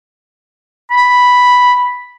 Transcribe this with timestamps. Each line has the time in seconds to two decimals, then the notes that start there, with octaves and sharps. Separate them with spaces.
0.91 B5